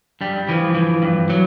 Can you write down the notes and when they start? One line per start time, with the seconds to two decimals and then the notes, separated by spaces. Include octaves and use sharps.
0.21 G2 G3
0.49 E3 F3
0.75 E3
1.02 G2
1.30 F#3